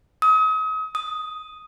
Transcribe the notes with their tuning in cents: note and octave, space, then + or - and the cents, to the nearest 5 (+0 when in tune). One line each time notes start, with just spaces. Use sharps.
D#6 +35
D#6 +5